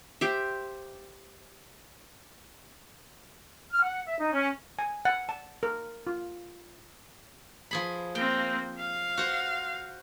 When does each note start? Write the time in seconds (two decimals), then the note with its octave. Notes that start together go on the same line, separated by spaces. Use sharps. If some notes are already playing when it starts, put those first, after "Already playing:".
0.21 G4 C5 E5
3.72 F6
3.83 F#5
4.06 E5
4.19 D#4
4.32 C#4
4.79 G#5
5.05 F#5
5.29 A5
5.63 A#4
6.07 F4
7.71 F3 G#4 B5
8.15 A#3 C4 G5
8.79 F5
9.17 F#4 C5